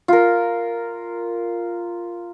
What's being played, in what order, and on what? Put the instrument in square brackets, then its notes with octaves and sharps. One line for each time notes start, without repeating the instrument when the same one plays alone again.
[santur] F4 A#4